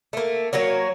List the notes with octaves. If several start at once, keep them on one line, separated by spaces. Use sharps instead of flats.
A3 A#3
F#3 A#3 F#4 C#5